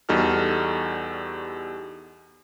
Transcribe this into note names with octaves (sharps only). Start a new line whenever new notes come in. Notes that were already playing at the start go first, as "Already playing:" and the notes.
E2 G3 D#4 F#4 A4 F6